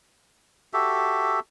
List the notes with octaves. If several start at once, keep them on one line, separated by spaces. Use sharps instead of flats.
F#4 G4 A4 E5